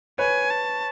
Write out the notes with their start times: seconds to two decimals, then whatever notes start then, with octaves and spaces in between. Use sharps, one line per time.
0.19 B4 C#5 G#5
0.50 A5